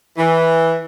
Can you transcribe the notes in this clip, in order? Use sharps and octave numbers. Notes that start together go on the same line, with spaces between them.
E3